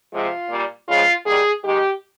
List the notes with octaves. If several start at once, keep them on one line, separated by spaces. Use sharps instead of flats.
C3 F3 G#3 F4
A#2 G3 A#3
C#3 F3 G#3 F4
D#3 G3 A#3 G#4
D#3 G#3 G4